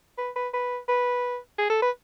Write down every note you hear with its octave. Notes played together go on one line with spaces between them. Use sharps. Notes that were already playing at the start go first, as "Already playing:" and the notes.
B4
B4
B4
B4
G#4
A4
B4